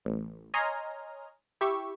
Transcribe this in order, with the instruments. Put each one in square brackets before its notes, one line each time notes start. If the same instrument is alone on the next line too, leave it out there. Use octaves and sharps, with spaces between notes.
[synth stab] A1
C#5 D#5 G#5 A#5 C6 F6
E4 G4 E5 C#6